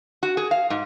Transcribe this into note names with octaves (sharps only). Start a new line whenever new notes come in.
F#4
G#4
F5
G#2